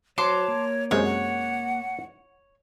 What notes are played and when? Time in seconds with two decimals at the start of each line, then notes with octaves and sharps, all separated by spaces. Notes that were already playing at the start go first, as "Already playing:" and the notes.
0.18 F#3 F#4 C5 C#5 A5 C6 D6
0.48 A#3
0.91 F#2 C3 G#3 C5 C#5
1.04 F#5